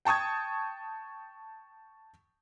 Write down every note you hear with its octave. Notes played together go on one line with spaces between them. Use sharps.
G5 A5 C#6 D#6 G#6